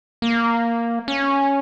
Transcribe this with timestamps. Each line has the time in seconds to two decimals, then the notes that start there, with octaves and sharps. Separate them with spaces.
0.22 A#3
1.08 C#4